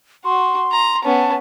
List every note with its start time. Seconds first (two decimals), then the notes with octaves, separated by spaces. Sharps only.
0.25 F#4 C6
0.72 A#5
1.04 B3 C#4 A5